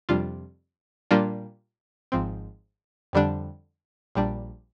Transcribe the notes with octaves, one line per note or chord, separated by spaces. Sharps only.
F2 C3 G3 D4 F4
A#2 G3 A#3 D4 F4
G#1 G#2 F3 C4
F2 D3 G3 D4
A#1 A#2 G3 D4